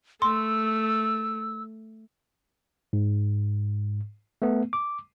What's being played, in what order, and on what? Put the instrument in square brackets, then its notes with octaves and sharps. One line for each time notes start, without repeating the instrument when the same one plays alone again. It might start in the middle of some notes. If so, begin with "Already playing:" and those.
[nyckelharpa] A3 [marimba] C6 [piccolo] E6
[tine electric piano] G#2
A3 B3
D6